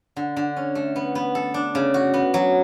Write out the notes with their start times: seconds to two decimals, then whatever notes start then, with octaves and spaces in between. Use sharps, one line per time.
0.16 D3
0.37 D3
0.57 C#4
0.75 A3
0.96 B3
1.15 B3
1.35 A4
1.54 D4
1.75 C#3
1.94 F#4
2.14 B3
2.34 F#3